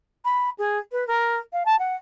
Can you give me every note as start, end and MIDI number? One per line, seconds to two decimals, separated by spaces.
0.25 0.50 83
0.58 0.79 68
0.92 1.07 71
1.07 1.39 70
1.53 1.63 77
1.65 1.78 81
1.79 1.96 78